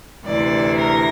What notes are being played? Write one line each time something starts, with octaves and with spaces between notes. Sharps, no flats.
D2 C3 E3 D5
A#4